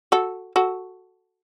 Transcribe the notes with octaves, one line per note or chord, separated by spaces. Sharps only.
F#4 A4
F#4 A4